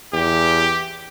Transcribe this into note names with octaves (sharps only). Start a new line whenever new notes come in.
E2 G4